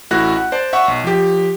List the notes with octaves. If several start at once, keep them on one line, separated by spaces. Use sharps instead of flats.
A1 A3 E4 F#4 F#6 A#6
F#5
C5 D5 A5
E5 F#5 C#6
B1
F3 G4